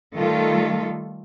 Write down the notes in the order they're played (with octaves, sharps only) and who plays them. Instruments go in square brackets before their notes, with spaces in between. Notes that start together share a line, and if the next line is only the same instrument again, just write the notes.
[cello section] D#3 G3 A3 F4 A4